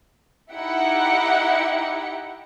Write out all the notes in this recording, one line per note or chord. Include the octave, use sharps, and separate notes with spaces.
D#4 E4 G4 F#5 G5 C#7